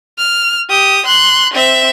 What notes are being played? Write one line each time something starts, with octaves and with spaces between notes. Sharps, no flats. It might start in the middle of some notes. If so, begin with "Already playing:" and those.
F6
G4 D#6
C6 F#6
C4 E5